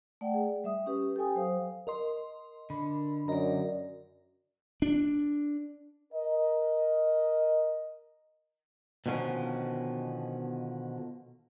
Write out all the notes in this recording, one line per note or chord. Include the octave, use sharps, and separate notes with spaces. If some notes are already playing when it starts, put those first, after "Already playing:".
A3 D5 F#5 G5
G#4
G3 E5 D#6
C#4 G4 B4
G4 A4 G5 G#5 D#6
F#3 C5 F5
A#4 D#5 C6
D3 B5
F#2 A#4 D5 D#5 A#5
D4
A#4 D#5
B2 D3 D#3 F3 C#4